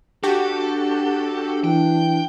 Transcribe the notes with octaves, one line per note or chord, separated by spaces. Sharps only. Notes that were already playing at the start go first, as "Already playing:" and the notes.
D4 F#4 G4 A4
E3 G5